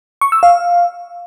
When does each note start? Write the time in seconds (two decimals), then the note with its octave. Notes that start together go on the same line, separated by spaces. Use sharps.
0.21 C#6
0.32 E6
0.43 F5